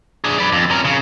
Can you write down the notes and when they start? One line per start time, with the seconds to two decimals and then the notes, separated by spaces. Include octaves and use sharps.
0.24 D4 G#4
0.38 B4 D5
0.52 F2
0.71 C#4 A#4
0.85 C#3